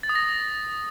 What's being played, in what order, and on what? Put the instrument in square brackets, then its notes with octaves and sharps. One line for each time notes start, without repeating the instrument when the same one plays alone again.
[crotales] A6
D#6
A#6